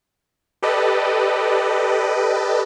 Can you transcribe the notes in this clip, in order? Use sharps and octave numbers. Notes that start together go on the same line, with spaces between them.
G4 A4 B4 D5 D#5